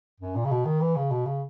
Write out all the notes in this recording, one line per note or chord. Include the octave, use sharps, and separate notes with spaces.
F#2
A#2
C#3
B2
D#3
E3
C#3
B2
C#3